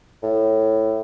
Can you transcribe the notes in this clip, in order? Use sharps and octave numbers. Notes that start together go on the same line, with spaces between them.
A2